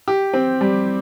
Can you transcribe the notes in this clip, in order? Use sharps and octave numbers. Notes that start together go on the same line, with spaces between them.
G4
C4
G3